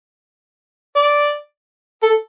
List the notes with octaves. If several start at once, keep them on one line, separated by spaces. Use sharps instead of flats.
D5
A4